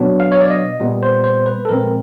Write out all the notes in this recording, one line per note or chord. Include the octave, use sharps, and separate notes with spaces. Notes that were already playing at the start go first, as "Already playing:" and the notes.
Already playing: B2 F#3 B3 D4
F5
C#5
D5
D#5
A#2 G3 B3
C5
C5
B4
A4
A#2 F3 G#3 C4 A#4